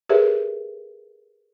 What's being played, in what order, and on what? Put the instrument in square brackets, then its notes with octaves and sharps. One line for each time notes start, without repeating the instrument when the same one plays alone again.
[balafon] G4 G#4 A#4 B4 C#5 E5